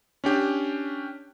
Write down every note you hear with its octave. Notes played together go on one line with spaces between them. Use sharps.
C#4 D4 G4